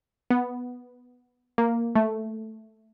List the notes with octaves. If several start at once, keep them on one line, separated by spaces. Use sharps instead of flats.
B3
A#3
A3